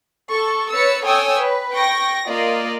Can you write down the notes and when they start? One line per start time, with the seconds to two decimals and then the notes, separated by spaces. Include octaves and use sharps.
0.31 A4 C#6
0.74 B4 C#5 E6 A6 C#7
1.05 A4 C#5 G5 G#5 D#6 E6
1.38 B4
1.74 G5 C#6 A#6
2.28 A#3 F4 D5 D#5